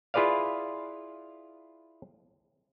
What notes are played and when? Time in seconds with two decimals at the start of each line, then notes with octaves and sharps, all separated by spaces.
0.14 E4 F4 G#4 B4 D5 F5